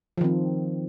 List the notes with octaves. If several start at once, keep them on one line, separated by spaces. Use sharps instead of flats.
D#3 F3 C4